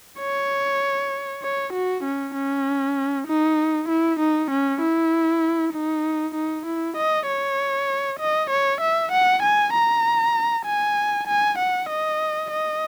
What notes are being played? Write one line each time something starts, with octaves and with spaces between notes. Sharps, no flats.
C#5
C#5
F#4
C#4
C#4
D#4
E4
D#4
C#4
E4
D#4
D#4
E4
D#5
C#5
D#5
C#5
E5
F#5
G#5
A#5
G#5
G#5
F#5
D#5
D#5